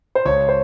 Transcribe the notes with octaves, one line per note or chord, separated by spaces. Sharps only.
C5
C#2 C#5
C5